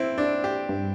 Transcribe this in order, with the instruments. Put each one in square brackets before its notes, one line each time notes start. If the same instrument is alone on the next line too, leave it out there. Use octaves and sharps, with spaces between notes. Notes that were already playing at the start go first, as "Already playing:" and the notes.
Already playing: [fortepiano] C4 E4
D4
G4
[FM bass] G2